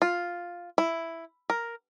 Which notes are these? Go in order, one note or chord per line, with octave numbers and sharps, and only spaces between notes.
F4
E4
A#4